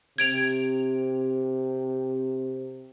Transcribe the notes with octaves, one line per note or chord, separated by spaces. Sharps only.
C3 G#6 D7 F7